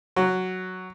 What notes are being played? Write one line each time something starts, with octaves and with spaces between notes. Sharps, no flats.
F#3